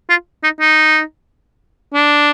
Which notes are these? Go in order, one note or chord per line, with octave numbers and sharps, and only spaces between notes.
F4
D#4
D#4
D4